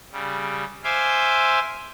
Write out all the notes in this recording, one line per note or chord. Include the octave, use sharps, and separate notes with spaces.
C#3 G3
C5 E5 F5 G#5 C6 D6